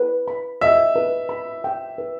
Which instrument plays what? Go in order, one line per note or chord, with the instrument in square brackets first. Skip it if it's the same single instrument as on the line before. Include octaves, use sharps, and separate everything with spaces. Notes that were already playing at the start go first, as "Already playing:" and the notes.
Already playing: [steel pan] B4
B5
[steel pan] D#5 [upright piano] E5
[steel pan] B4
B5
G5
B4